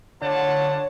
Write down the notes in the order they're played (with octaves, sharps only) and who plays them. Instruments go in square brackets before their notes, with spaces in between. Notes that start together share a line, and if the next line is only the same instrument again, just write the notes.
[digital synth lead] D3 [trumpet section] F4 F#5 A5 [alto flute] C#5